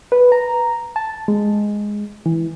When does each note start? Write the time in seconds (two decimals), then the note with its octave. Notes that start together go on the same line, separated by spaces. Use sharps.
0.12 B4
0.32 A#5
0.96 A5
1.28 G#3
2.26 E3